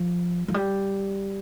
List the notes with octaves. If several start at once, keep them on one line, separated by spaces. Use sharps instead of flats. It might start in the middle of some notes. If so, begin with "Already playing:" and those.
Already playing: F3
F3
G3